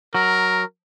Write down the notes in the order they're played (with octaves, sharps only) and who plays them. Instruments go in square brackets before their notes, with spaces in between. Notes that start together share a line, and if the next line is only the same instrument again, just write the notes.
[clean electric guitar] F#3 [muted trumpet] A#4